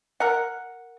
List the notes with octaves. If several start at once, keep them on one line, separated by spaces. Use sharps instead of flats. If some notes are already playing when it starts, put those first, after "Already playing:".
A#4 F#5